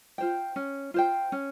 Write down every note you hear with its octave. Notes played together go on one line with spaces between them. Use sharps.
F4 C5 G5
C#4
F4 C5 G5
C#4